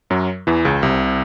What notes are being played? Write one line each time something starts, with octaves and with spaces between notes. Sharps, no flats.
F#2 F#3
E2 E3
C#2 C#3
C2 C3